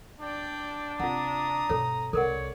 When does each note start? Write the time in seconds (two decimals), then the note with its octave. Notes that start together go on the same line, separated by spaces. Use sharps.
0.20 D4 D5 G5
1.00 C3 F4 F#5 A#5 D#6
1.69 G2 B2 A4 C#5
2.13 C2 A4 A#4 C#5 D5 F#5